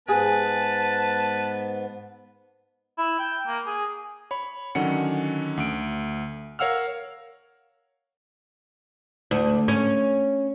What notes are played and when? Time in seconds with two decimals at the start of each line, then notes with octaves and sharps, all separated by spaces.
0.08 G#2 B3 G#4 B4 G#5 A5
2.98 E4
3.19 G5
3.47 A#3
3.66 G#4
4.31 C#5 B5
4.75 D3 D#3 F#3 C#4 F#5 C#7
5.57 D2 D7
6.59 A#4 C#5 F5 F#5 E6 F6
9.31 D2
9.68 C#4